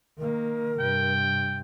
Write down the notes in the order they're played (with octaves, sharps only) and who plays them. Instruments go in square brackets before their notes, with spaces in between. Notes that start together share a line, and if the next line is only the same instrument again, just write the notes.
[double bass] D#3 A#3 [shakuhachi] A#4
[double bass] G2 C3 [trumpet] G5